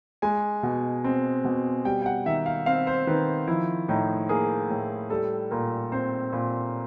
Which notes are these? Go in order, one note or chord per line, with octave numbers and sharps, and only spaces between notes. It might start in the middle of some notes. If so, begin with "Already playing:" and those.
G#3 G#5
B2
C4
B2
G3 G5
G5
F#5
D#3 E5
F5
C4 F5
C5
D#3 B4
F3 E4
A2 D#4
A#3 G#4
A2
G3 A4
A#2 A#4
C4 C5
A#2